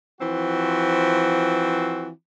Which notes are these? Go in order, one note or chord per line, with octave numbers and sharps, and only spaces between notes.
E3 F3 C4 F#4